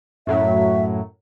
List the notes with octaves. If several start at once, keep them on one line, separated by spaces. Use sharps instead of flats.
F#2 A2 F#3 E5